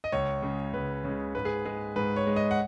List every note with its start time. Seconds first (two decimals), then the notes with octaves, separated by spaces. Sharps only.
0.04 D#5
0.12 C#2 C#5
0.42 C#3 G#3
0.74 C#2 B4
1.04 C#3 G#3
1.35 G#2 B4
1.45 G#4
1.65 G#3 G#4
1.96 G#2 B4
2.16 C#5
2.27 G#3
2.36 D#5
2.51 F#5